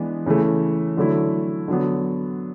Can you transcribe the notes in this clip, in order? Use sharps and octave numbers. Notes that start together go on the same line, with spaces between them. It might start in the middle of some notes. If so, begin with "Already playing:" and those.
Already playing: E3 G#3 B3 D4
C#3 E3 A3
D3 F#3 A3 E4
D3 F#3 B3